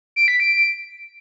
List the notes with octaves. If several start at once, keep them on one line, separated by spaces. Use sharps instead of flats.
D7
B6
D7